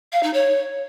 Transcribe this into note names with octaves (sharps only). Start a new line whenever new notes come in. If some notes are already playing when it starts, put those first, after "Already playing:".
F5
D#4
C#5